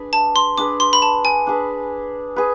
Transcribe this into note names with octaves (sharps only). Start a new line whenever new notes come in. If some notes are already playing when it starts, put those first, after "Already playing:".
Already playing: D4 G#4 B4
A5
C6
D4 G#4 B4 D6
C6
B5
A5
G#5
D4 G#4 B4
G#4 B4